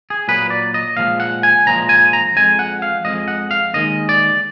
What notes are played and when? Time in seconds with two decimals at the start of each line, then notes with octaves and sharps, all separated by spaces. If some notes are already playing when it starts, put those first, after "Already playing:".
0.10 G#4
0.28 A#2 F#3 A#3 B4
0.50 D5
0.74 D#5
0.97 A#2 F3 G#3 F5
1.20 F#5
1.43 G#5
1.66 A#2 F3 G#3 A#5
1.89 G#5
2.13 A#5
2.36 F2 F3 G#3 G#5
2.59 F#5
2.82 F5
3.05 F2 F3 G#3 D#5
3.28 F#5
3.51 F5
3.74 D#2 D#3 G#3 D#5
4.09 D5